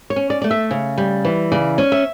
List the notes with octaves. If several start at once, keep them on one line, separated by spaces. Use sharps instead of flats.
C#5
C#4
D5
A3 D5
E5
C#3
G3
E3
C#3 D5
C#4
E5